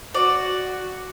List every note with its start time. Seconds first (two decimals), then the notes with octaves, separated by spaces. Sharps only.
0.14 F#4 D5